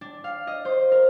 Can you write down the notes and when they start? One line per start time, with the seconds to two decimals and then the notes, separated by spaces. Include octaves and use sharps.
0.01 D4
0.24 F5
0.47 D#5
0.65 C5
0.92 A#4